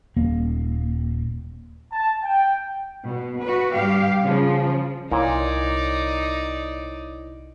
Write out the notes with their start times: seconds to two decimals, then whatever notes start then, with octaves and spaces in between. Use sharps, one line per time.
0.16 D#1 A#3
1.92 A5
2.22 G5
3.04 B2
3.42 F#4 B4
3.73 G2 G4 F5
4.23 C#3 F3
5.11 C2 A#2 D#4 E4 C#5 D5